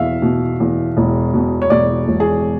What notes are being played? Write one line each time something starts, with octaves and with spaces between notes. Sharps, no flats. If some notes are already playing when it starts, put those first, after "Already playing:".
Already playing: E2 B2 E5 F5
B2
E2
E1
B2
C#5
E1 D5
E1
G#4